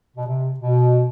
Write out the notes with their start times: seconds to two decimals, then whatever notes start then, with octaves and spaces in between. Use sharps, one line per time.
0.17 B2
0.27 C3
0.59 B2